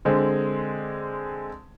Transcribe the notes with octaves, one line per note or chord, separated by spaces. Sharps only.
D3 G#3 C4